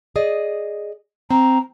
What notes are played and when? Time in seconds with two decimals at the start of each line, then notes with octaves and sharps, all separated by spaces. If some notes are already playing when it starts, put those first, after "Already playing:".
0.16 G#4 D5 D#5
1.30 C4 A#5